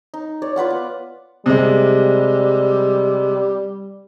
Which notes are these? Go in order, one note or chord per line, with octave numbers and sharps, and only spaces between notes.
D#4
C#5 D5
F4 B4 F#5 D6
B3
C3 G3 G#3